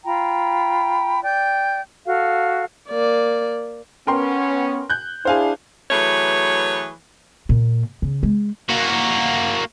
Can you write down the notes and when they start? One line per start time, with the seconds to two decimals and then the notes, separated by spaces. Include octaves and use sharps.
0.05 F4 G5 A#5 B5
1.23 D5 G5 G6
2.06 F#4 A4 F5
2.90 A#3 D5
4.07 B3 C#4 A#4 G5 C6
4.90 F#6 G6
5.25 D4 E4 G#4 C5 F5 G#5
5.91 E3 F#3 A3 G#4 B4 C#5
7.49 A#2
8.02 C#3
8.23 G#3
8.70 A#3 F#4